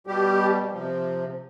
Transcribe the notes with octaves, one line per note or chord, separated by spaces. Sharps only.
B2 G3 G4
C3 F3